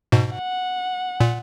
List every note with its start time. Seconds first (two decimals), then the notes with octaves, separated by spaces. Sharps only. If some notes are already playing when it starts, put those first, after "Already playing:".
0.12 G#2 B2
0.34 F#5
1.20 A#2